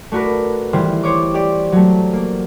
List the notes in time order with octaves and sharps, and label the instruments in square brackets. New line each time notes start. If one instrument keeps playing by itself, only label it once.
[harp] A3 D4 F#4 A#4 B4
D#3 E3 G3 C5
C5 C#5 D6
G4 D5
F#3 A3
A#3